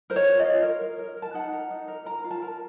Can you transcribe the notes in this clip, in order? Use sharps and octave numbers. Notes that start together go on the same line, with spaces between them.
A#4 C5
C#5
F4
D#5
F4
A#4
A#4
A#4
A#4
A5
D#4 F#5
A#4
D#4
A#4
A#4 A#5
F4
A5
A#4